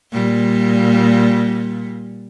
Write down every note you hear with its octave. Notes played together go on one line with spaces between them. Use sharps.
A#2 G3